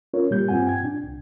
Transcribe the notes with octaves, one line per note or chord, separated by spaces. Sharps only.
C#4 F4 A#4 C#5
A#2 G3 A#3 G4 G6
G2 C4 F4 F#5 G#5
G5 G#6
A#2 D4
C2